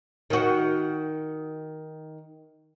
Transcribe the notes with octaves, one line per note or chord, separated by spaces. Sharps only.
D#3 F#4